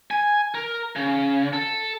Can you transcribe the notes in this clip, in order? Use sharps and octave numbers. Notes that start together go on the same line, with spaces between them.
G#5
A#4
C#3
A4